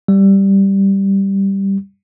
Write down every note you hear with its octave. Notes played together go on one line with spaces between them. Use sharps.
G3